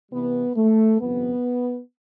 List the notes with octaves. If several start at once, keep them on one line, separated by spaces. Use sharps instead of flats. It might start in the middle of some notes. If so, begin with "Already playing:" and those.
C2 C3 E3 G3 B3
A3
G1 F2 C3 B3